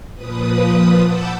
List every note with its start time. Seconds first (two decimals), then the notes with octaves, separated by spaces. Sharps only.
0.15 A#2 F3 B4 D#6
1.04 F#5 A5 B5 D6 E6 G6